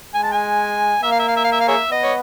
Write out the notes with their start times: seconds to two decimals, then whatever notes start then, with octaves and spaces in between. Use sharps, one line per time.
0.14 G#3 G#5
0.23 A5
0.32 G#5
1.02 A#3 E5
1.11 F5
1.19 E5
1.28 F5
1.36 E5
1.44 F5
1.52 E5
1.60 F5
1.68 G#4 C#5 E5
1.91 B3 D#5
2.03 C#5